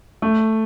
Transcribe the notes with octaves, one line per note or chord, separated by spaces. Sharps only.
A3